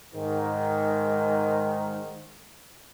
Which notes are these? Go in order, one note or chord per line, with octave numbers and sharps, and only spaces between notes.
G#2 D#3